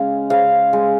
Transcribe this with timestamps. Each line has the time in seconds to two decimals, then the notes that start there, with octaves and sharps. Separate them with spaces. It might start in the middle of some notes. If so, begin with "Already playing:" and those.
Already playing: C#3 G#3 F5
0.30 C#3 F5
0.73 G#3